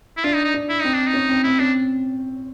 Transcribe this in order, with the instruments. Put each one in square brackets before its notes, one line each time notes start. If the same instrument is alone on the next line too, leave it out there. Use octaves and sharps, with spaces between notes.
[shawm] E4
[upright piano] D4 [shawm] F4
[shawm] D#4
D#4
[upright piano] D4
[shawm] E4
[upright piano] C4 [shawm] D#4
[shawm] D4
D#4
[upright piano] C#4
C4
[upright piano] C4 [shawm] E4
[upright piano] C#4 [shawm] D4